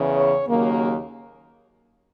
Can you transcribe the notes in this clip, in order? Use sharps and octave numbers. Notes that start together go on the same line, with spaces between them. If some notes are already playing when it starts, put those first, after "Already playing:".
Already playing: E2 C#3 E3
C#5
D#2 C#3 F#3 A#3